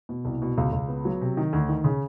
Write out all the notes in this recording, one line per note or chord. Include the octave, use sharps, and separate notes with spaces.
B2
C2
B2
C#2
C#2
B3
F#3
C3
D#3
D2
D#3
C#3